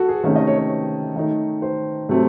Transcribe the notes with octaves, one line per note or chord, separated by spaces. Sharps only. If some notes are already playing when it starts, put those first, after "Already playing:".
Already playing: F#4 A4
G#4
C3 D#3 A3 C#4
D#5
C#5
C#5
D#3 A3 D#4
C5
C3 F#3 A3 C4